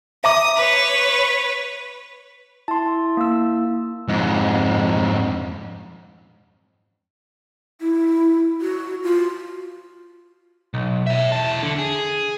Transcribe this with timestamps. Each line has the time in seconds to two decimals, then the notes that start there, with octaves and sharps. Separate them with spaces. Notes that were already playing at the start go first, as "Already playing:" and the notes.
0.24 E5 A#5 D6 D#6
0.56 B4 C#5
2.68 E4 A5 C6
3.17 A#3 E6
4.08 F2 G#2
7.81 E4
8.61 F#4
9.04 F4
10.74 B1
11.07 C#5 E5
11.32 E2 A5
11.63 D3
11.79 G#4